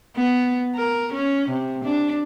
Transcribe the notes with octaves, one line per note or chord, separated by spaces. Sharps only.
B3
A#4
C#4
C3
D4